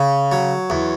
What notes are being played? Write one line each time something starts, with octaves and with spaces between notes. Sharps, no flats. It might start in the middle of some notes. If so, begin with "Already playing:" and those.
Already playing: C#3
F#3
E2